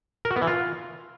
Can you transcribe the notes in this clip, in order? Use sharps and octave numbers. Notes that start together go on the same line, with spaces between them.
A#4
F#4
B3
E3
F4